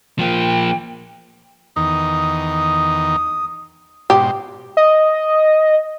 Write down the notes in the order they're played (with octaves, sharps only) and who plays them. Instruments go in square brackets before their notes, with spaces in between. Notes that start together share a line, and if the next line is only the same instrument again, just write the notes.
[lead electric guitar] F3 A#3 [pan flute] G5
[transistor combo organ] E2 D#3 D#4 [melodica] D#6
[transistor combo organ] G#2 B2 C5 [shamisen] G4
[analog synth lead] D#5